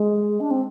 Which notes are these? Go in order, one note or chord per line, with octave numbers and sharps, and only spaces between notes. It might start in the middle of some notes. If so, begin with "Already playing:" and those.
Already playing: G#3
D4
C4